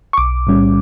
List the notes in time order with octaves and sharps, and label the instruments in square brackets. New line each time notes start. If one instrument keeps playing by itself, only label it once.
[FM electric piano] C#6
B1 D6
A2 G3 C#4